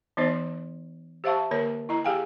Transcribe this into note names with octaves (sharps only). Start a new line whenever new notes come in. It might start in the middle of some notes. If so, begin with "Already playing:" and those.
E3 B3 D#4 C5 D#5
G4 C5 E5 F5 A5 C#6
D3 A#3 A#4 C#5
E4 D#5 A#5
G4 G#4 F5 G5 G#5